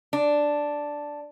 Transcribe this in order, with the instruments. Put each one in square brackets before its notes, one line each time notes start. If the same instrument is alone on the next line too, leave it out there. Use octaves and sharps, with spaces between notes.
[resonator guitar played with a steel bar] D4